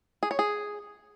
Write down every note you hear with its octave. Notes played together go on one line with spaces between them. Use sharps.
G#4
C#5
G#4